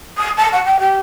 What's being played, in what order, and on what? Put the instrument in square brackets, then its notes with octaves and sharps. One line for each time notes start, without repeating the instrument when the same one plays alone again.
[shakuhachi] D#6
A5
F#5
G5
G4